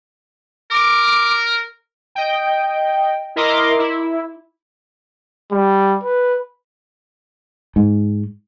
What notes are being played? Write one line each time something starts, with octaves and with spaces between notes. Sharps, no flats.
A#4 D6
D#5 G5
E4 A#4 D#5 A#5 C6 D6
E4
G3
B4
G#2